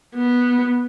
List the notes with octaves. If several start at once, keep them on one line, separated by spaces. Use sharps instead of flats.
B3